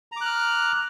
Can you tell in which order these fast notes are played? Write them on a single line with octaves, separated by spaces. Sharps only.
A#5 D6 F#6 F6